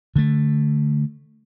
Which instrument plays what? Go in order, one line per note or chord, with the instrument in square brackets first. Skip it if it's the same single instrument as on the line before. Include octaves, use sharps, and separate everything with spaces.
[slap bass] D3 A3